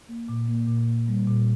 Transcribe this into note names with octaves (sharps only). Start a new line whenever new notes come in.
A#3
A#2
A#3
A#2
A#3
G3
A#2